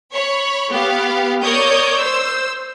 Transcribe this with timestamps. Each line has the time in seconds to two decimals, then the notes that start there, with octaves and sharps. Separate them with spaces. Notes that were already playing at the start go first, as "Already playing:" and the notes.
0.13 C#5 B5
0.70 B3 G4 F5
1.42 A#4 C#5 D5 C#6 D#6 G6
1.97 C5 E6